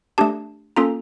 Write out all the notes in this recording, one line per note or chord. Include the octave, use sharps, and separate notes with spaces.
A3 D4 G4 A5
A#3 C#4 F4 A4 A#5